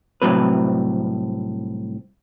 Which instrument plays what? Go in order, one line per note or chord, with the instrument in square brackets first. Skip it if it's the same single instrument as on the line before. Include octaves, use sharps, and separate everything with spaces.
[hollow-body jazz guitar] C2 A2 F#3 C4 B4